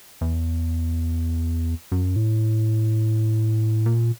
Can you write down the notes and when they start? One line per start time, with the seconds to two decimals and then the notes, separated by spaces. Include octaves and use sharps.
0.21 E2
1.92 F#2
2.16 A2
3.86 A#2